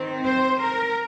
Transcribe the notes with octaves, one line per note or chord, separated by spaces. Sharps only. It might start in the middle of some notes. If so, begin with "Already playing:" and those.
Already playing: D#3 C4
C5
A#4